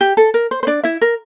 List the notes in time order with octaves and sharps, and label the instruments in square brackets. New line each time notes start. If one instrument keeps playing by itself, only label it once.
[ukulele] G4
A4
A#4
C5
C5
D4 D5
E4 E5
A#4